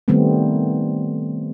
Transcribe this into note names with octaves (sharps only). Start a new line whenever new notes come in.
D#3 G3 A3 B3 C4